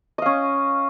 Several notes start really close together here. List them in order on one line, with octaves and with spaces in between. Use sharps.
D#5 F5 C#4